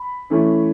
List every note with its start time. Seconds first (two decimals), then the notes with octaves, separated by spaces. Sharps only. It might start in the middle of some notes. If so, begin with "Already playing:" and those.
Already playing: B5
0.30 E3 A3 C#4